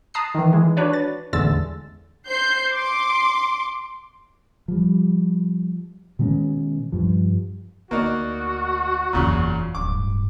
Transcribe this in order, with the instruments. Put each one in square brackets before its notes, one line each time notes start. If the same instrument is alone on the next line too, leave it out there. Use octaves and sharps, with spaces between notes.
[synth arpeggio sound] A5 A#5 D#6 F#6 C7
D#3 E3
E3 G#3
D4 F#4 B4 C#5 D5
A6
A1 E2 D3 G#3 E6 A6
[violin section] C5 G6 C7
C6 D6
[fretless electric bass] F3 G3
B2 D#3 G#3 C#4
G2 F3
[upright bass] D2 [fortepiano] A#3 D#4 D5 [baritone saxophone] F#4
[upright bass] F#1 E2 [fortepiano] A#2 C#3 F#3
[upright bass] D1 G2 [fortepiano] D6